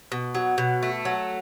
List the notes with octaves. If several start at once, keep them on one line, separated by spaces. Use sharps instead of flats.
B2
F#3
B2
A3
F#3